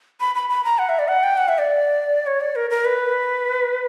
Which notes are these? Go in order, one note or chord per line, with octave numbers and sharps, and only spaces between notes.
B5
B5
B5
A#5
F#5
E5
D5
F#5
G5
F#5
E5
D5
C#5
D5
A#4
A#4
B4